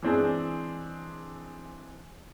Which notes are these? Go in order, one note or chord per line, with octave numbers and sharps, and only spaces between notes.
E3 G#3 C4 D4 G#4